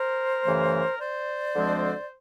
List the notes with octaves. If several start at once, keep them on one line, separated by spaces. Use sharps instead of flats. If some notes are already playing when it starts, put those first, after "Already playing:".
Already playing: A#4 C5
F#2 C#3 E3 A3
C5 D5
D2 D3 F3 G#3 C4